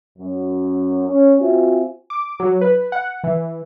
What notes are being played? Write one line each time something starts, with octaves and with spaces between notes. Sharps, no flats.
F#2
C#4
C4 F4 F#4 E5 G#5
D6
F#3
B4
F#5
E3